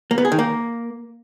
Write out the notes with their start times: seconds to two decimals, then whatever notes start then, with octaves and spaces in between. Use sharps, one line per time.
0.11 A#3
0.18 B3
0.25 G#4
0.32 D#3
0.39 A#3